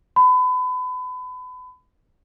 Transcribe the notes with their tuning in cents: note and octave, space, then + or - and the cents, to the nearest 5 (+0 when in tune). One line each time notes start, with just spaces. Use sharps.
B5 +30